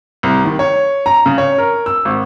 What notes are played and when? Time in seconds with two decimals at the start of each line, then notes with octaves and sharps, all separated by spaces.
0.23 C2
0.45 D#3
0.59 C#5
1.06 A#5
1.26 C#3
1.38 C#5
1.58 A#4
1.86 E6
2.05 G#1